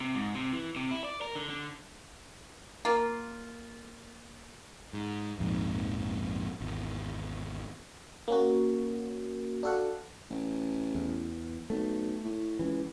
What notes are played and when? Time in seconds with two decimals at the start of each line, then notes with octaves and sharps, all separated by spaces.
0.01 C3
0.15 G#2
0.35 C3
0.52 E3
0.76 C3
0.91 E4
1.05 D5
1.21 A#4
1.35 D3
1.50 D3
2.85 A#3 F4
4.93 G#2
5.39 A#1 F2 G#2
6.60 G#1 E2
8.28 A#3 C#4 F#4
9.63 D4 F#4 A4 F5 F#5
10.30 A1
10.95 E2
11.70 B1 A3
12.25 A2
12.59 C#2 E3